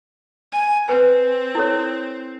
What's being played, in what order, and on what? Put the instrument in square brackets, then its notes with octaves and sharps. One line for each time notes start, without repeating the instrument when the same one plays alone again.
[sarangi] G#5
[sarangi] C4 [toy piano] B4 G#5
[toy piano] E4 A4 C#5